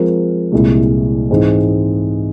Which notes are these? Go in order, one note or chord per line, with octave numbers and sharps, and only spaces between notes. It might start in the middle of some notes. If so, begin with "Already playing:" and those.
Already playing: F3 G#3 C4 F4 A#4
C2 A#2 G#3 E4
G#2 E3 G#3 C4